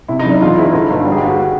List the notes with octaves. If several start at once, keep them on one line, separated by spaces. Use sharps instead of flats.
C3 E4
D#4
F#1 D4
E1 F4
E2 E4
D3 D#4
G1
G3 F#4
G#4
D#2 G4
F#4